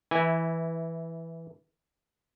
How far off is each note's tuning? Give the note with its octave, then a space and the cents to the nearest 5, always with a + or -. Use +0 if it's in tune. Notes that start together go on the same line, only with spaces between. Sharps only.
E3 +0 E4 -15 G#5 -10